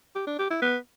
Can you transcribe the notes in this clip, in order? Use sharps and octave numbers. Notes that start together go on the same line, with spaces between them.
G4
D4
G4
E4
B3